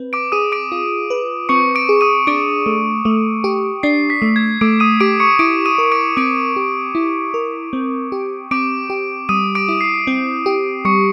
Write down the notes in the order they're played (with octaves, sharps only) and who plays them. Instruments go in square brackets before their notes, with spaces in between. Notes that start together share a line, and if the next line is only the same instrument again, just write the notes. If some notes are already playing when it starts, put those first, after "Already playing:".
Already playing: [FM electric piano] C4 B4
[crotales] D6 D7
[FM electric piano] G#4 [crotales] D#6 D#7
[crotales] D6 D7
[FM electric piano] F4
B4
[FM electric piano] C4 [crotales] C#6 C#7
[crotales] D6 D7
[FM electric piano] G#4
[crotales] D#6 D#7
[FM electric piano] D4 [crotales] D6 D7
[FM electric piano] A3
A3
G4
[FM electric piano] D4 [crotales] C7
[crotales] B6
[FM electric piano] A3
[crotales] G#6
[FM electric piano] A3 [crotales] D6 D7
[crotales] D#6 D#7
[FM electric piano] G4 [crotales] D6 D7
[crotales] C#6 C#7
[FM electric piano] E4 [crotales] D6 D7
[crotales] D#6 D#7
[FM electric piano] A#4
[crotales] D6 D7
[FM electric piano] C4 [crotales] D6 D7
[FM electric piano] G4
E4
A#4
C4
G4
[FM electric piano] C4 [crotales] D6 D7
[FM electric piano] G4
[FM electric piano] G3 [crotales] D#6 D#7
[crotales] D6 D7
[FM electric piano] E4
[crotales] C7
[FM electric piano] C4
G4
[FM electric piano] G3 [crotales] C#6 C#7